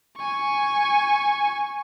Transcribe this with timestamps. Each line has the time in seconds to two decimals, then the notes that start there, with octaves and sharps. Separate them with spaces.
0.17 G#5 C#6